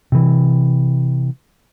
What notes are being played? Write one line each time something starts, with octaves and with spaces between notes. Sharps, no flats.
C3 E3